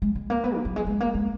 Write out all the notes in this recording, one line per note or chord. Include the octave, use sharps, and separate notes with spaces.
G#3
G#3
A#3
B3
D#3
F#3
G#3
G#3
A#3
G#3